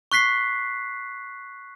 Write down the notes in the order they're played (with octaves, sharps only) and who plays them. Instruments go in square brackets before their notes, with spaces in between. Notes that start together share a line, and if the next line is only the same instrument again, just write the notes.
[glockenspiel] C#6 F#6 B6 C7